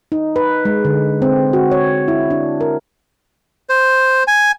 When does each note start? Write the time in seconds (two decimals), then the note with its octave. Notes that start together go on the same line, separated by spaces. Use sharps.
0.12 D#4
0.36 B4
0.65 G#3
0.85 D3
1.22 C4
1.53 F#4
1.71 C#5
2.08 E4
2.30 D4
2.61 A#4
3.70 C5
4.28 G#5